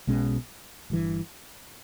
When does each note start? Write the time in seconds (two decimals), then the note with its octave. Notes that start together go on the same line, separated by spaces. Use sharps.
0.07 B1 B2 G#3 C#4
0.90 G1 G2 E3